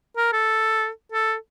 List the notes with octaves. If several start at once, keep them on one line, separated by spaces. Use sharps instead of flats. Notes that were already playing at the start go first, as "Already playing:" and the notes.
A#4
A4
A4